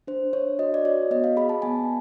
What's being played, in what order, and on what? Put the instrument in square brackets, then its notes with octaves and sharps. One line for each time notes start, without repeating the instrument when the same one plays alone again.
[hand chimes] D4 C5
D4 C#5
F#4 D#5
D5
F#4 C#5
B3 D#5
F5
G#4 B5
A5
B3 G#5